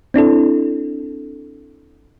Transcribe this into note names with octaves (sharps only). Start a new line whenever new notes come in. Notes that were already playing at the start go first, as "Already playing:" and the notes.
C4 D4 E4 A4